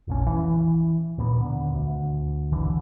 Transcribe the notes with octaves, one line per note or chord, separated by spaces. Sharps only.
F1 A#1 C#4
E3
D#2 A#2 B3
D3
D2
F#1 B1 D3 E3